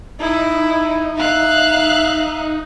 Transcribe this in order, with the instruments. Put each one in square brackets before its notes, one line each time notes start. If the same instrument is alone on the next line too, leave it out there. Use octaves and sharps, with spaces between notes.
[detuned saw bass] D#4 [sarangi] E4
[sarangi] E5 [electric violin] F5 F#6